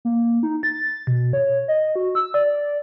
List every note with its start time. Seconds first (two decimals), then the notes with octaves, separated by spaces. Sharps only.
0.05 A#3
0.43 D#4
0.63 A6
1.07 B2
1.33 C#5
1.68 D#5
1.96 F#4
2.15 E6
2.34 D5